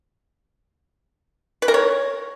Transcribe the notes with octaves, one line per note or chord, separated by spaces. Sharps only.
B4
A#4
C#5